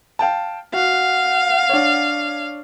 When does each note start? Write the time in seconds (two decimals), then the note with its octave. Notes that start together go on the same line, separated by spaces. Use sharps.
0.19 F5 G5 A5
0.73 F#4 F5 F#5
1.69 D4 C#5